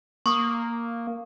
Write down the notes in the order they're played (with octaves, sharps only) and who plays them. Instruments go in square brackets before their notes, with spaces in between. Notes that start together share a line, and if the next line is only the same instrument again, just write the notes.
[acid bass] A#3 [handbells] C#6 D#6